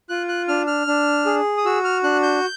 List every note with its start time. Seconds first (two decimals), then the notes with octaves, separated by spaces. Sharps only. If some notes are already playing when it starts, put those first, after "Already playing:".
0.09 F4 F#6
0.29 F#6
0.48 D4 F6
0.67 F6
0.87 D4
1.26 G#4
1.57 D#6
1.65 F#4 E6
1.84 F6
2.04 D4 F#6
2.23 G6